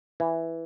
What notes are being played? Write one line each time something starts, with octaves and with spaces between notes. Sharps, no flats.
E3